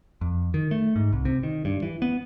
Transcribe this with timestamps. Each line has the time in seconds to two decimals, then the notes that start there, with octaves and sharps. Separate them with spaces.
0.21 F2
0.54 D#3
0.71 A3
0.96 G#2
1.13 C2
1.25 C3
1.43 D#3
1.65 G2
1.82 E3
2.02 B3